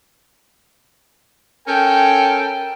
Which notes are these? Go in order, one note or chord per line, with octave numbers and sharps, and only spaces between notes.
C#4 A4 A#4 G5